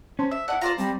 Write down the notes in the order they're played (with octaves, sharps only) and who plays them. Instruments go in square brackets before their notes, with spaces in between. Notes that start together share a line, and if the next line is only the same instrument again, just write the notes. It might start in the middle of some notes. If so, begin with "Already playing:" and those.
[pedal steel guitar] C#4 [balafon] C5 A5 C6
[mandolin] E5 [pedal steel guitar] E6
[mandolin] E4 G4 F#5 [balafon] D5 D#5 A5
[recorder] F4 [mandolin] C5 D5 A#5 [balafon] F5
[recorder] G3 [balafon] C4